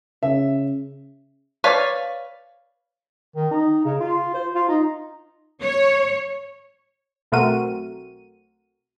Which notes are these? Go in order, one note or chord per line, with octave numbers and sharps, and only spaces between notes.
C#3 E5
B4 C#5 D5 F5
D#3
D#4
C#3
F4
C5
F4
D#4
C#5
B1 A3 C4 F#4 A#4 D#7